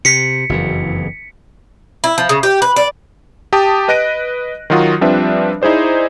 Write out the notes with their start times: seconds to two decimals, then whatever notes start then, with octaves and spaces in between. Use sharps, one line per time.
0.05 C3 B6 C#7
0.49 F#1 F2 E3
2.04 E4
2.18 F3
2.29 C#3
2.43 G4
2.62 B4
2.76 D5
3.53 G4 G5 A5 D#6
3.88 B4 D#5 F#6 A#6 D7 D#7
4.70 D#3 F#3 F4 F#4 D#6
5.01 F3 G3 C4 D4 B4 E5
5.62 D#4 E4 G#4 C5 D5